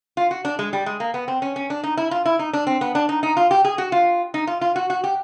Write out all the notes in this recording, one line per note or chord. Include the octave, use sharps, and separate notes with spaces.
F4
F#4
D4
G#3
G3
G#3
A#3
B3
C4
C#4
C#4
D4
D#4
E4
F4
E4
D#4
D4
C4
B3
D4
D#4
D#4
F4
G4
G#4
F#4
F4
D#4
F4
F4
F#4
F#4
G4